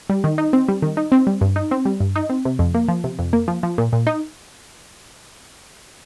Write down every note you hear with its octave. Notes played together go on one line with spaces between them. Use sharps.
G3
D#3
D#4
C4
G3
D#3
D#4
C4
G3
G2
D#4
C4
G3
G2
D#4
C4
C3
F2
A#3
F3
C3
F2
A#3
F3
F3
A#2
A#2
D#4